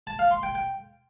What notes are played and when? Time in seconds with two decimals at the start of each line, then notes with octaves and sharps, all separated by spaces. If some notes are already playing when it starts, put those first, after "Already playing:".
0.07 A5
0.19 F5
0.31 C6
0.43 G5
0.55 G5